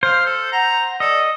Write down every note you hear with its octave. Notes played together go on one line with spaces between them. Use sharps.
C5 F5
A4
F#5 A#5
A4 D5 D#5